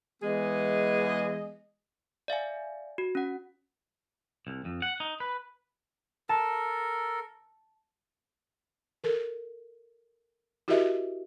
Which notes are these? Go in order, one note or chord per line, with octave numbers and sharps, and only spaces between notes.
E3 G#3 B3 G#4 D#5
D5 E5 F5 G#5
F#4
C#4 F#5
C2
F2
F#5
D#4
B4
A4 A#4 A5
A4 A#4
E4 F#4 G4 A#4 D#5 E5